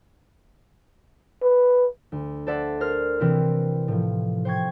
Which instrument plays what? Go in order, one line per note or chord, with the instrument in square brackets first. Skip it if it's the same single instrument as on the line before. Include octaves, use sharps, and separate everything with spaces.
[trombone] B4
[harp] D2
A4 C5 D5 E5 F#5
A#4 C5 F6
C3 E3 C4 E4
A2 F3
C5 G5 C#6 G#6